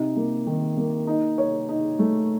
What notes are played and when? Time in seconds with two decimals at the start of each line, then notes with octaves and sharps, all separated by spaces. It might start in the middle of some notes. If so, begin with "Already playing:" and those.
Already playing: C3 D#4
0.16 A#3
0.47 D#3
0.77 A#3
1.07 D#4
1.38 C#5
1.69 D#4
1.99 A3